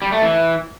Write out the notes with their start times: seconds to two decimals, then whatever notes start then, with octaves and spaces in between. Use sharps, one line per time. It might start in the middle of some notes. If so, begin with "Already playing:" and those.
0.02 G3
0.12 A3
0.22 E3